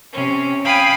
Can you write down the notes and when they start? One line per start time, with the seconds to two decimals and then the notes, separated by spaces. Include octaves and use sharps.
0.12 C3 C#4
0.65 F5 G5 G#5 B5 D#6